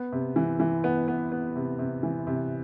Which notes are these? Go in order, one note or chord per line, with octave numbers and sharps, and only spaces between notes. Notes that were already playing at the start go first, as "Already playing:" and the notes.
Already playing: B3
C3
E3
E3
B3
B3
B3
C3
C3
E3
C3